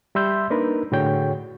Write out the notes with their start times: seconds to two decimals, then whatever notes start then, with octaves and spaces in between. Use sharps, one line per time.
0.15 G3 E5 C6 E6 G6
0.50 A#3 D4 D#4 A#4 B4
0.92 A2 D3 F#4 G#4 C#5 G5